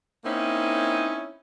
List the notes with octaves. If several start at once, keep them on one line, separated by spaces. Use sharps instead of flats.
A#3 C4 C#4 D#4 E4